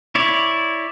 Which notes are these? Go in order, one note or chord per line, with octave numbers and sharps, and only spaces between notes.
E4 C#5 D5